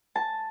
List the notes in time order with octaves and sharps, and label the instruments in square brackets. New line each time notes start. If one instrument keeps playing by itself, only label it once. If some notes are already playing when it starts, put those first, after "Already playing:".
[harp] A5